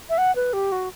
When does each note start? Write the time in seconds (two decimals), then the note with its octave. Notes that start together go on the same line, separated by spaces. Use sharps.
0.10 E5
0.18 F#5
0.36 B4
0.53 G4
0.72 F#4